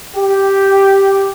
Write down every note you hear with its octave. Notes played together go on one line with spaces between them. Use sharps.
G4